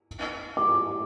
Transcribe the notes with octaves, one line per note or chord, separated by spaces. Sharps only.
D6